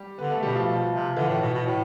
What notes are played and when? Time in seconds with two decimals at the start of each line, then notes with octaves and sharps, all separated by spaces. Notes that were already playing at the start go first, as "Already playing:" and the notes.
Already playing: G3 G4
0.18 D3 B3 B4
0.31 A3 A4
0.43 B2 G3 G4
0.55 F3 F4
0.67 B2
0.92 C3
1.16 D3 E3 E4
1.28 A2
1.41 B2
1.53 B2
1.66 A2